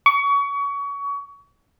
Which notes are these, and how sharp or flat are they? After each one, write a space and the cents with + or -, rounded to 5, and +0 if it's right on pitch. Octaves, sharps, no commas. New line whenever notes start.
C#6 +30